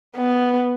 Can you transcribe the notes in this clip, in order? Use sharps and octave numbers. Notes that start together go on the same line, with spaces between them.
B3